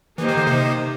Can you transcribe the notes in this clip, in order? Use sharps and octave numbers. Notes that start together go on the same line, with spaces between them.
E3 A#3 D#4 G4 C5
D#3
D3
C3